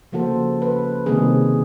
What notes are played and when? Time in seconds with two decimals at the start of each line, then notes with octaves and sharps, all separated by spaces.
0.12 C#3 F3 A#3 F#4 A4 C5
0.62 B4
1.06 C3 D#3 G3 A#3 C4 G#4